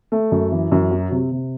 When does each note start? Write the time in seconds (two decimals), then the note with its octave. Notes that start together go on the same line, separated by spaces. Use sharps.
0.12 A3
0.32 F#2
0.52 E3
0.72 F#2
0.91 F#3
1.11 C3
1.31 C3